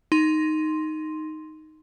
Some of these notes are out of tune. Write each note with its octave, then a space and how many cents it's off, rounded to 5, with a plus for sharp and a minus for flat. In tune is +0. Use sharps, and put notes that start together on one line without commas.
D#4 +0 C6 +0